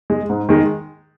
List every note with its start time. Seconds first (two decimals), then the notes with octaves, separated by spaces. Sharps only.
0.10 G#3
0.30 G#2
0.49 D#3 G#3